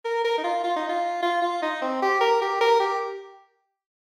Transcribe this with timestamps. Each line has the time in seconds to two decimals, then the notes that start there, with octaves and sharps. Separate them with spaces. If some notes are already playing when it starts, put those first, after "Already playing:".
0.05 A#4
0.24 A#4
0.38 D#4
0.44 F4
0.64 F4
0.76 D#4
0.89 F4
1.23 F4
1.42 F4
1.62 D#4
1.81 C4
2.02 G4
2.21 A#4
2.41 G4
2.61 A#4
2.80 G4